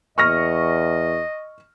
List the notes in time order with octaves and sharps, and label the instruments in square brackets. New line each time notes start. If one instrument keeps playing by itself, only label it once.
[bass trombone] E2 [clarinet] D#5 [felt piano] C#6 F6 A#6